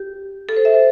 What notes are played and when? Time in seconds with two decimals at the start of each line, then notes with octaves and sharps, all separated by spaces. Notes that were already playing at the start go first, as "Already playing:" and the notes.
Already playing: G4
0.49 A4
0.56 C5
0.65 E5
0.74 C5